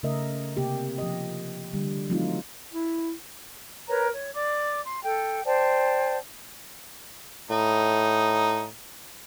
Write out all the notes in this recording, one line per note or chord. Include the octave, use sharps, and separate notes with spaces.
C#3 A3 A#4 D#5 E5
C3 A#3 G4
F3 G4 D#5
D3 G3
F3 F#3 A3 C4 D#4 F4
E4
A#4 B4 C#5 A#5
C#5
D5 D6
C6
A4 G5
C5 D5 G5 A5
A2 D#4